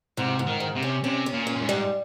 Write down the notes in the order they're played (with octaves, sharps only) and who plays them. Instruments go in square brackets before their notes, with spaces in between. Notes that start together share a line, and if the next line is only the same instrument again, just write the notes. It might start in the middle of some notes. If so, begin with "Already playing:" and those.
[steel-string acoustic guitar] G#2 [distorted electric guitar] C3
[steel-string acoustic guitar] G#2
[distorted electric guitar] D#3
[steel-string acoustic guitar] G#2
[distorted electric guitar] C3
[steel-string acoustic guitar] C#4
[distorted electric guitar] C3 [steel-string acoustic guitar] C#4
[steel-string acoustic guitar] C#4
[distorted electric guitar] A#2
[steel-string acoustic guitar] C#4
[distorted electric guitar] A#2
G#2
[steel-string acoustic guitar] G3